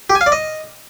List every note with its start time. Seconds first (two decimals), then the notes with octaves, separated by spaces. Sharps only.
0.10 G4
0.15 G#5
0.21 F5
0.26 D5
0.32 D#5